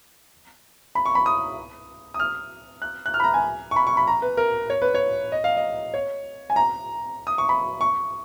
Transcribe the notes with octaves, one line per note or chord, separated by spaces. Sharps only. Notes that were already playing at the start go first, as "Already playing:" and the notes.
B5
C#6
B5
D#6
D#6
F6
F#6
F#6
F6
B5
A#5
G#5
C#6
B5
C#6
B5
A#5
B4
A#4
C#5
B4
C#5
D#5
F5
D#5
C#5
G#5
A#5
D#6
C#6
B5
C#6